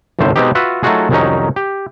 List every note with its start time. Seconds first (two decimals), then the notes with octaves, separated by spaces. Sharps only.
0.19 G1 C2 A2 A3 C5
0.36 B2 G#3 B3 C4 D#4 G4
0.55 F4 F#4 B4 E5
0.83 F#3 A3 D#4 F4 F#4 G#4
1.10 C2 F2 D#3 F#3 C#4 D#4
1.56 G4